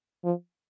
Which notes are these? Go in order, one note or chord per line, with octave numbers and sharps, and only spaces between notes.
F3